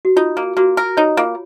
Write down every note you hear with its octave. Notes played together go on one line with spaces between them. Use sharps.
F#4
D#4 F4
A#3
A#3 F#4
A#4
D#4 C#5
A#3 F4